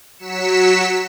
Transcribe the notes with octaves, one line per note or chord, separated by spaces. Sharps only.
F#3 B6 C#7 E7